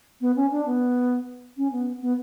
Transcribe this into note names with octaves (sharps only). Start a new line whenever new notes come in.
B3
C#4
D4
B3
C#4
B3
B3